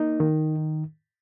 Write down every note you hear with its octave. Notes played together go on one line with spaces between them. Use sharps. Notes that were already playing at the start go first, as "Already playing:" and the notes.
Already playing: A#3 D#4
D#3